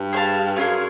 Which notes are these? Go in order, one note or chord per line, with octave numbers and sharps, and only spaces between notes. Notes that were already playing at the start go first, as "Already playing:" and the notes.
Already playing: G2
G#4 C5 F5 A5
F#2 A3 C#4 F4 G#4